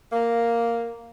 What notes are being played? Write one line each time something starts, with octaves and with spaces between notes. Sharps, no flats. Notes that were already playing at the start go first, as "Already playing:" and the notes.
A#3